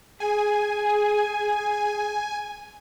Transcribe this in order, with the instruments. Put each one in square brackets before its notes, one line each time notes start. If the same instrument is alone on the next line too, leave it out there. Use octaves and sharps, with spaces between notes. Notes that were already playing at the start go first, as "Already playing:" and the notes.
[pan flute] G#4 [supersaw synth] G#5